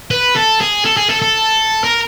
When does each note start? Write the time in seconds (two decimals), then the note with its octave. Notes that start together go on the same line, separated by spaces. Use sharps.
0.11 B4
0.35 A4
0.61 G#4
0.85 A4
0.97 G#4
1.10 A4
1.22 A4
1.84 A#4